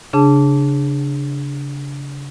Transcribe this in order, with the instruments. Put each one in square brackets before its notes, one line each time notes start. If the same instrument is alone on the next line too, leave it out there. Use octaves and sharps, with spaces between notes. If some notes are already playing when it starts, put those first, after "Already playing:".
[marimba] C#3 D4 G#4 A5